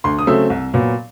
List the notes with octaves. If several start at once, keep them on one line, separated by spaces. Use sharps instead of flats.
D2 C6
D#6
C#3 F#3 A3 C4 E6
C2
A#2 F#3 B3